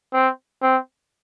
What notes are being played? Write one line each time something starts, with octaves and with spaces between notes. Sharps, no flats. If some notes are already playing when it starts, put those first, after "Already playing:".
C4
C4